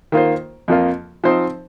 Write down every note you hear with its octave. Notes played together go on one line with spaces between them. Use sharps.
D#3 A#3 F4 C5
F2 F3 A#3 F4
F3 C4 D#4 C5